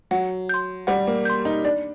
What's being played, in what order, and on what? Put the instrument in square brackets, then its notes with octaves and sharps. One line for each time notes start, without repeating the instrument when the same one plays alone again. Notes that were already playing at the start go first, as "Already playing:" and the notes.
[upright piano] F#3 [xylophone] F#5
[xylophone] C6 G6
[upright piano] G3 [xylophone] F#5
[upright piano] A#3
[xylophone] C6 G6
[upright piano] D#4
[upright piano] D4 [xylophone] D5